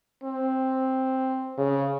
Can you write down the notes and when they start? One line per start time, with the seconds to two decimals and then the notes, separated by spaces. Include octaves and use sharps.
0.24 C4
1.58 C#3